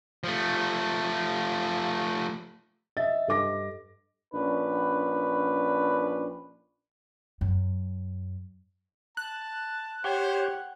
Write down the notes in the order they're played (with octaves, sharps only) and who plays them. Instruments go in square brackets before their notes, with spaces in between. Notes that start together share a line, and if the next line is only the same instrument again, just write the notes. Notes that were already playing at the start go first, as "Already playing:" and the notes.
[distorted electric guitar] F3 A3
[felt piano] D#5 E5 A6
G2 A4 D#5 D6 A#6
[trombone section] A#1 C#4 D4 B4
[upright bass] F#2
[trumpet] A5 [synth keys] F#6
[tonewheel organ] G4 C#5 [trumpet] C5 [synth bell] F#5 G5